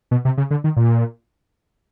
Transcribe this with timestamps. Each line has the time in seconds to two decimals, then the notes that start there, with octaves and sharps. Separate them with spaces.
0.11 B2
0.25 C3
0.38 C#3
0.51 D3
0.64 D#3
0.77 A#2